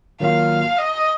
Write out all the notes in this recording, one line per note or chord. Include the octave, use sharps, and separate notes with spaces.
D#3 F#3 A#3 F4 F5
D#5